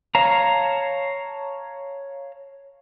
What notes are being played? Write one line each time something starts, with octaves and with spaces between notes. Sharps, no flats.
C#5 F5 A5 A#5